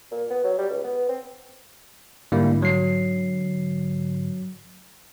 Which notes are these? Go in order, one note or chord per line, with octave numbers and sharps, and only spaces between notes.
A#2
B3
F#3
G3
C#2
B3
C4
G#2 D3 G3 A#3 E4
F#3 C7